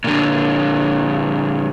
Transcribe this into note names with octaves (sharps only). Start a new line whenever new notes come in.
A#2 D3